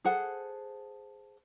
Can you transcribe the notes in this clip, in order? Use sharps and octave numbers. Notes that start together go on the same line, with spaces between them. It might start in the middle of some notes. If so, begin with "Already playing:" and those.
G#4 A4 C5 F#5